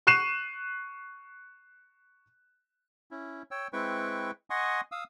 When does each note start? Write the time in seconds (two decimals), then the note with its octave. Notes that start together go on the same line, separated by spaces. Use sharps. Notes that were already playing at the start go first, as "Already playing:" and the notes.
0.07 C#6 F#6 C7 D#7 E7
3.11 C#4 E4
3.51 C#5 G5 E6
3.73 G#3 C4 E4 B4 G5 C#6
4.50 D#5 F#5 G#5 C6 C#6 D#6
4.92 F5 D#6 E6